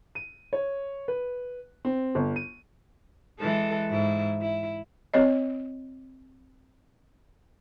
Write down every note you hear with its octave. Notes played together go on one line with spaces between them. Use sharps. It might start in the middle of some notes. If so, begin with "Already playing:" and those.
D#7
C#5
B4
C4
G1
D#7
E3 G#3 A4
G#2 E4
E4
C4 C#5 D#5